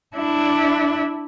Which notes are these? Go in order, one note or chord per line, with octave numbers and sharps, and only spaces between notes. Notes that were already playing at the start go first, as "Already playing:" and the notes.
D4 E4